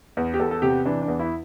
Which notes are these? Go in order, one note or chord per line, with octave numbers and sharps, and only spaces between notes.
E2
G4
E2 A4
A4
C3 G4
E3 D4
D4
E2
E4